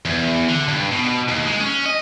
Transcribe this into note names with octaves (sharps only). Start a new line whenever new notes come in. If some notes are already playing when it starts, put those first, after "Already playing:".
E2
D3
G2
B2
D#2
G#3
C#4
D#5